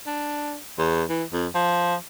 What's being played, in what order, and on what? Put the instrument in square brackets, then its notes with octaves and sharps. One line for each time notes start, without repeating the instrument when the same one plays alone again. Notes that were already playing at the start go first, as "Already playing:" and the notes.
[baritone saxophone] D4
E2
E3
F2
F3